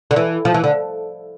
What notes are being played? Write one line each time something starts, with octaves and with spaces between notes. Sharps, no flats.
D3
E3
F3
E3
D3